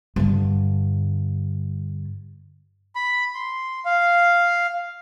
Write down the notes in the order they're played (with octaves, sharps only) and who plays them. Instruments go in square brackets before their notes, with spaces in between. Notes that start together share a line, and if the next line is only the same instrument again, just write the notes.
[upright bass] G2 D3
[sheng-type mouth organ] B5
C6
F5